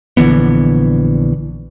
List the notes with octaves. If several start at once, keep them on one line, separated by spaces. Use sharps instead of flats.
A#1 D3 E3 B3